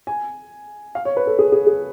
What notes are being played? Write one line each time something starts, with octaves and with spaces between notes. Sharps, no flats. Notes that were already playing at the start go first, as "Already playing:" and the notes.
G#5
F5
C#5
B4
A4
G#4
G#4
G#4